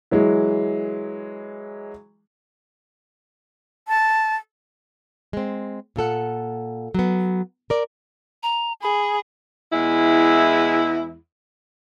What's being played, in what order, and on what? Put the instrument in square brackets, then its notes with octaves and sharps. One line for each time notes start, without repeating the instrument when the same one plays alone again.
[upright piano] E3 F#3 G#3
[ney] A5
[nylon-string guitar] G#3 C4
A#2 F4 A4 F#5
F#3 B3
A#4 D5
[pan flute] A#5
[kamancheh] G#4 [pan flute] B5
[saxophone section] E2 G#3 E4